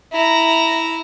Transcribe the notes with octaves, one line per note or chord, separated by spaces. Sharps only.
E4 A#5